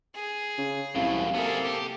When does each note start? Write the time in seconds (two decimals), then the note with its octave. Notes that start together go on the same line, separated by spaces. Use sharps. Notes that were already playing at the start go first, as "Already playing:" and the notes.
0.15 G#4
0.58 C#3
0.95 C2 F#2 A2 F5
1.34 C3 A#3 B3 G#4 A4
1.65 G4